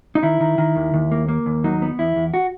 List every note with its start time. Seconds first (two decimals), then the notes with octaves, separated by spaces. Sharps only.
0.15 D#4
0.23 D#3 E4
0.41 D#3
0.58 D#3
0.76 D#2
0.94 D#2
1.12 A#3
1.28 A#3
1.46 D#2
1.64 F#3 D#4
1.82 B3
1.99 E2 E4
2.16 E2
2.34 F#4